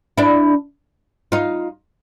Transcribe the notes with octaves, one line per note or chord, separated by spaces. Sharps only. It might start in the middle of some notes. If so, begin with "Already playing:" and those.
D4 E4
D#4 F4